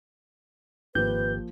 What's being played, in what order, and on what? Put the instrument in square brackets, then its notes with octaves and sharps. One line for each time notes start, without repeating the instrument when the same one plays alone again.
[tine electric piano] G#1 G4 [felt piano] F3 A#3 [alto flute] B4 [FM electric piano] G6